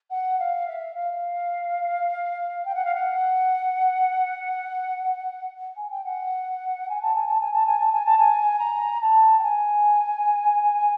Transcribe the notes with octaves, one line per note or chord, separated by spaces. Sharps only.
F#5
F5
E5
F5
G5
F#5
F5
F#5
G#5
G5
F#5
G#5
A5
G#5
A5
G#5
A5
G#5
A5
G#5
A5
G#5
A#5
A5
G5
G#5